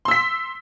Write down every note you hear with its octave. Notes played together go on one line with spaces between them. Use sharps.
C6 E6 B6